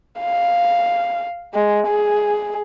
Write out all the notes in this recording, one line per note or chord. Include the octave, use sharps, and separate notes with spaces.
F5
G#3
G#4